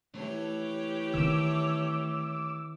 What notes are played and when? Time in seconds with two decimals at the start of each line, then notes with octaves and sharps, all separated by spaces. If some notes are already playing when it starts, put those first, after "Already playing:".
0.15 E3 A3 G4 C#5 E5
1.14 D#3 C4 D6 E6